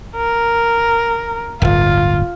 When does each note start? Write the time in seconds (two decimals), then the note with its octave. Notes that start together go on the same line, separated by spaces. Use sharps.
0.16 A#4
1.62 D1 G1 F4